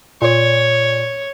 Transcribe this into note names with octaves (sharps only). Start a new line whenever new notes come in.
A#2 C#5